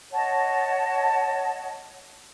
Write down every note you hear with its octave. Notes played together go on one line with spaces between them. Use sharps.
C#5 D#5 F#5 A5